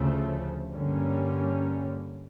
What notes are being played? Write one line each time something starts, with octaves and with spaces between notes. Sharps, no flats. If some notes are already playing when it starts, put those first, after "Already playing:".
Already playing: D2 C#3 F3 A3
G2 D3 G3 A#3 C#4